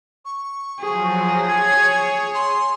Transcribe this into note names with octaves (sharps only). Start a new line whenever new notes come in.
C#6
F3 F#3 G#4
C#5 G#6
C6